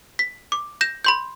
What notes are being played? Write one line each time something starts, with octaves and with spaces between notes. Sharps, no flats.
B6
D6
G6 A#6 E7
B5 C6 G6